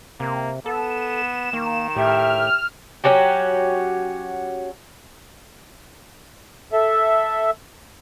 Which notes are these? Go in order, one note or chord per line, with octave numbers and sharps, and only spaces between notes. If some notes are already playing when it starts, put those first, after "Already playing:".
C3 A#3
B3 A4 E7
D#3 A#3
A2 G4 E5 F6
F#3 C#4 F#4 G4
A4 E5